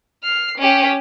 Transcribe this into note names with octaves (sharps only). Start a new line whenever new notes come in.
F6 C7
C#4 G4